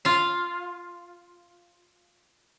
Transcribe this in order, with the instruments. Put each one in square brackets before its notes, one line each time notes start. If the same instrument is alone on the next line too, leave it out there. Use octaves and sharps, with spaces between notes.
[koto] F4 F5